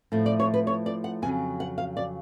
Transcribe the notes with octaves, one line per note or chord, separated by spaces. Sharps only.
A2 F3 A3
D5
C#5
B4
C#5
D5
F#5
F2 C#3 F#3 G#5
F#5
F5
D5